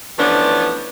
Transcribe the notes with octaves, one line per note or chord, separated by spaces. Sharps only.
E3 F3 A3 B3 C#4 D4